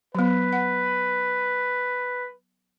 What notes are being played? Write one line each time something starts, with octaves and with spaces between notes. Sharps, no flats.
F#3 B3 B4
F#5